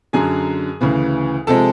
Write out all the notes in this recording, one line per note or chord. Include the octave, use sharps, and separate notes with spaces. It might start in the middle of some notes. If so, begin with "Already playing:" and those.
F#2 D3 F#3 G#4 G#5
D2 C#3 E3
C3 F3 G#3 A4 A5